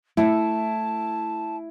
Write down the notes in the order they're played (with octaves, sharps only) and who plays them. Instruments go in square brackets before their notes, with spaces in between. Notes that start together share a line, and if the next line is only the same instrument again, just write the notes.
[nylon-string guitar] A3 [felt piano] E4 [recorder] A5